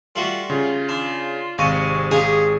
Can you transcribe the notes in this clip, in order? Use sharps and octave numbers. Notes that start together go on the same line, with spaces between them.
G3 A3 F4 F#4
C#3 F4
D4 F4
G#1 C3 G#3 F5 C#6 D#7
D#4 F4 G4 G#4